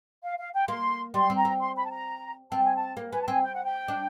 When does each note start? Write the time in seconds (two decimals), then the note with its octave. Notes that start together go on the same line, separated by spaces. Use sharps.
0.23 F5
0.38 F5
0.53 G5
0.68 A#3 C6
1.14 G3 C6
1.30 C4
1.37 A#5
1.45 C4
1.60 C6
1.75 B5
1.86 A5
1.90 A#5
2.51 C4 A5
2.63 G#5
2.75 A5
2.97 A#3
3.12 B3 G#5
3.21 A5
3.28 C4 G#5
3.42 G5
3.53 F#5
3.64 G5
3.88 D4